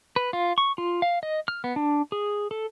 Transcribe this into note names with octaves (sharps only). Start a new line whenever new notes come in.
B4
F4
C#6
F4
F5
D#5
F6
B3
D4
G#4
A4